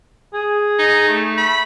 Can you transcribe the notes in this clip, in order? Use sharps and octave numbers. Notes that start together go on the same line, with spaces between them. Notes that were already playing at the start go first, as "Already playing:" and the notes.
G#4
D#4
A3
B5